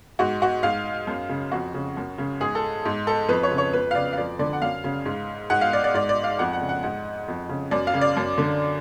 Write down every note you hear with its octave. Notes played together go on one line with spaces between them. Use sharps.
G#2 F#4
F#4
G#2 F5
F#2
C#3
F2 F#4
C#3
F#2
C#3
G#2 G#4
A4
G#2
A4
F2 B4
C#5
C#3
C#5
F2 B4
F5
C#3 D5
F5
F2 D5
D3 D5
F#5
F#2 F5
C#3
G#2
G#2 F#5
F5
D5
D5
G#2 D5
D5
F5
F2 F#5
F#5
C#3
F#5
G#2 F#5
F2
C#3
F#2 D5
F5
C#3
D5
F#2
D3